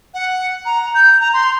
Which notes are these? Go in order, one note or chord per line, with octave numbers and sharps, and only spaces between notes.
F#5
A#5
G6
A#5
C6